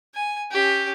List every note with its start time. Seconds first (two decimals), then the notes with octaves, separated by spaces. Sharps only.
0.14 G#5
0.51 C#4 G4